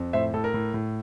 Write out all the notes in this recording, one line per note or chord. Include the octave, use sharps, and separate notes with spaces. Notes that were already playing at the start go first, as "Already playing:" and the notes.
Already playing: F2
A2 C5 E5
A2 A4
A#4
A2
A2